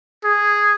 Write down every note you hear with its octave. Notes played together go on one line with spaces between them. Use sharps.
G#4